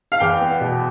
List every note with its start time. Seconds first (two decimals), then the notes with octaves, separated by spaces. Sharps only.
0.12 F5
0.20 E2 G5
0.40 B3
0.60 B2